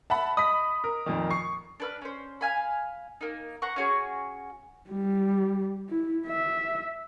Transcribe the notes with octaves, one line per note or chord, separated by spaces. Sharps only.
E5 F#5 A5 B5
D#5 B5 D#6 B6
A#4
F2 A#2 D#3
C#6 C7
D4 B4 F6
C#4 C5
F5 G#5 B5
A#3 D#4
C5 F#5 A#5 C#6
C#4 F#4 G#4
G3
E4
E5